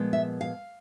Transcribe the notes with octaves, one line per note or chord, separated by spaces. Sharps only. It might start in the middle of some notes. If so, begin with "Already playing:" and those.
Already playing: A#2 F3 G#3 B3
E5
F5